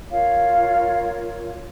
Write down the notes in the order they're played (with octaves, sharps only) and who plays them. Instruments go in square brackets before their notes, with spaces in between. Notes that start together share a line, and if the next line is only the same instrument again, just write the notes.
[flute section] F4 A#4 C#5 F5